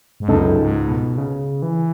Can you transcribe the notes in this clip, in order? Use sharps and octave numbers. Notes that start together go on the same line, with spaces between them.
G#2
C#2 F#2 C#3 G#3 D#4 A4
G#2
B2
C#3
E3